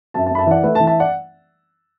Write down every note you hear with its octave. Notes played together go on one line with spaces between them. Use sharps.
F#2 E5 A5
E5 A5
F#2 B5
E5 A5
E3 D5 F#5
A3 B4 E5
E5 A5
E3
E5 A5
D5 F#5